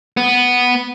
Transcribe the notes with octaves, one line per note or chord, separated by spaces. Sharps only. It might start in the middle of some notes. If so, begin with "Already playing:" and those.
B3